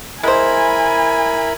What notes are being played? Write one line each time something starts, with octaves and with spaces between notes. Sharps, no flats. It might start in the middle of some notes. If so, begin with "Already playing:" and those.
G#3 E4 A#4 C5 G#5 B5